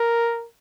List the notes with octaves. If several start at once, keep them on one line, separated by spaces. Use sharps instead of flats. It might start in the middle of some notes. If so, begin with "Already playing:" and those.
Already playing: A#4